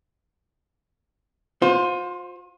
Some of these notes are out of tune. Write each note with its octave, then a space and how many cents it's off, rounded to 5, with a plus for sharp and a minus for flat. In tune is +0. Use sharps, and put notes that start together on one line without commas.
F4 +40 C5 +5